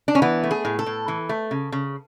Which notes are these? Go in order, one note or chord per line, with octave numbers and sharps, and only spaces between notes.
D4
C#4
E3 B3
A3
G#4
A2
A4
A2
E3
A3
C#3
C#3